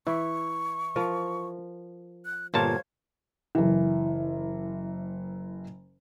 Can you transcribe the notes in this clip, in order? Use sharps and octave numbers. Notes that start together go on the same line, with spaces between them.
E3 E4 C#6
F3 A#4
F#6
G1 A#2 C5 C#5 F5 A5 G#6
F#1 E3